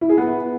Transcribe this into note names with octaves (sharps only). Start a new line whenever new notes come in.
E4
G#4
B3